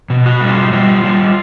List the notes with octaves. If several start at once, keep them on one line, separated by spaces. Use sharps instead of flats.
B2
F#4
G3
F4
G3 F4
G3